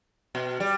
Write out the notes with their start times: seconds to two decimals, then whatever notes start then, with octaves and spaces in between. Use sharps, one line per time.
0.35 B2
0.60 G3